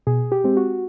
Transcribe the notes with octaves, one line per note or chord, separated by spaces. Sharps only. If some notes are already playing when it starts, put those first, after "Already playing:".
B2 G#4
G4
G#3 C4
F#4